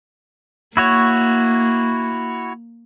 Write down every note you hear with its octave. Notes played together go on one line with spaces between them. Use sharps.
A#3 E4 F#4 C#5